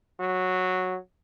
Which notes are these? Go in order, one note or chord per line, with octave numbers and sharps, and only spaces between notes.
F#3